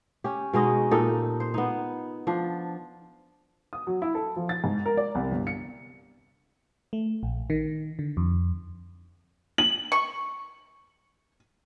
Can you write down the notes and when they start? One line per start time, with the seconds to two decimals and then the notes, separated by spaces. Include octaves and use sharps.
0.24 C#4 G4
0.53 B2 G#3 D#4 D#5
0.91 A#2 D#4 G4 A4
1.40 C5
1.54 B3 D#4
2.27 F3 D4
3.73 D#6
3.87 F#3
4.02 E4
4.15 A4
4.36 F3
4.49 A6
4.64 G#2
4.86 A#4
4.97 D5
5.15 C2
5.31 G1
5.47 C#7
6.93 A3
7.23 A#1
7.50 D#3
7.99 D3
8.17 F2
9.58 F#7
9.92 C#6